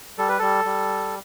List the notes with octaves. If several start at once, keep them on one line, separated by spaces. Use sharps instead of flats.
G3 A4
B4
G3 A4
G3